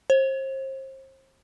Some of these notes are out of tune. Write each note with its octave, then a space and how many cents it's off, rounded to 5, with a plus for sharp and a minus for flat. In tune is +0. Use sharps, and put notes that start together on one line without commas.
C5 +35